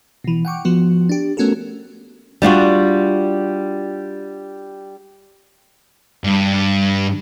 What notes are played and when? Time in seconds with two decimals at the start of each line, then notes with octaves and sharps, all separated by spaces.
0.24 B2 E3
0.45 F#5 G5 C#6 D6
0.65 F3 B3 F#4
1.09 D4 G4
1.37 A3 B3 C#4 F#4 A4 A#4
2.42 G3 D4 F4 F#4
6.24 G2